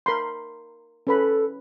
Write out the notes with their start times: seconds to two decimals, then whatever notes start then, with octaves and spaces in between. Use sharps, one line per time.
0.06 A#4 B5 C6
1.07 C#4 A4 B4 B5